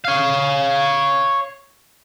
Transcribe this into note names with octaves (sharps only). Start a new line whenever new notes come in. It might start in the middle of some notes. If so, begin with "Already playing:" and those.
C#5 F5